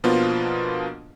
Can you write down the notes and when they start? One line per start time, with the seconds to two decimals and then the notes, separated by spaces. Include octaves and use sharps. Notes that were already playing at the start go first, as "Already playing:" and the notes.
0.04 B2 F3 A#3 B3 D4 F4